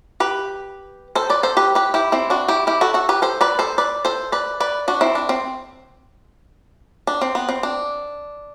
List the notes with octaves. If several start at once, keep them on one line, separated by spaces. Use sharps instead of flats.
G4 B4
A4 C5
B4 D5
A4 C5
G4 B4
G4 B4
E4 G4
C4 E4
D4 F#4
E4 G4
E4 G4
F#4 A4
F#4 A4
G4 B4
A4 C5
B4 D5
A4 C5
B4 D5
A4 C5
B4 D5
B4 D5
D4 F#4
C4 E4
D4
C4
D4
C4
B3
C4
D4